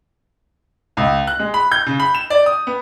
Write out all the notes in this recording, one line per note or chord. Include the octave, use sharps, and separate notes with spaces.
C#2
F#6
G#3
B5
G6
C#3
B5
E7
D5
D#6
B3